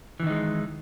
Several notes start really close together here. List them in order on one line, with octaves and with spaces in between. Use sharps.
E3 D#3 D#4 G#3